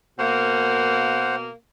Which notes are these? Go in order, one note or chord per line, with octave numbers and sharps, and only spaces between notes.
B2 A#3 C5 F#5